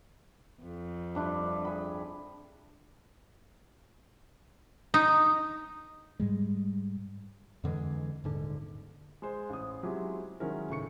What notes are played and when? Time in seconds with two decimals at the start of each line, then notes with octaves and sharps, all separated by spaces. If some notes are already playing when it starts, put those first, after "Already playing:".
0.63 F2
1.15 G2 D4 E4
1.65 G#4 G5 B5
4.94 D#4
6.20 G#2 G3 G#3
7.64 F2 D3 E3 G#3
8.24 D#1 G#2 D3
9.22 G#3 C5
9.50 A1 D#6
9.83 F#3 G#3 C4 E4 F4 G4
10.40 D#3 F#3 G#3 C#4 E4 A#4
10.69 C#2 A2 C#6 C#7